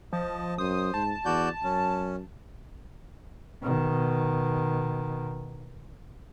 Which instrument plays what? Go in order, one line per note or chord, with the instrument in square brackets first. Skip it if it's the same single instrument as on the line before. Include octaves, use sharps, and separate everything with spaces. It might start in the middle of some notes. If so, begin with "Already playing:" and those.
[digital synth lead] F3 [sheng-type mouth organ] D#5 A5
[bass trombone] F#2 [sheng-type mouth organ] C5 [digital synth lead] D#6
[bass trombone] G#2 [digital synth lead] A5
[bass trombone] E2 [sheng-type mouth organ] F#4 D5 G6
[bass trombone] F#2 [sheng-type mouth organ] C#4
[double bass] B2 D#3